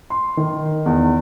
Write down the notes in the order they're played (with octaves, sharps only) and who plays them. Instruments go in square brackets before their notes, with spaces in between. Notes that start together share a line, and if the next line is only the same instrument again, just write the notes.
[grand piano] C6
D#3
E2